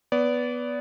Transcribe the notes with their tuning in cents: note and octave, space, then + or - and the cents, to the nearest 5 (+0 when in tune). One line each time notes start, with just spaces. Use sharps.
B3 +0 D5 -25